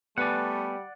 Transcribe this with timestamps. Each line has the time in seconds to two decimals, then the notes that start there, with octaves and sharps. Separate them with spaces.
0.18 G3 A3 B3 B4 D5 F#5 G#5